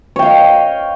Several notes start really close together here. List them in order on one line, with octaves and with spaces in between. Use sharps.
C#5 G5 F5 D#5